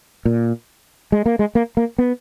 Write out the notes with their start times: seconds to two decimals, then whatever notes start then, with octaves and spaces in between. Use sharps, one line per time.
0.25 A#2
1.12 G#3
1.26 A#3
1.39 G#3
1.55 A#3
1.77 A#3
1.98 B3